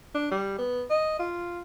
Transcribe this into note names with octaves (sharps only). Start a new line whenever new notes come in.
D4
G3
B3
D#5
F4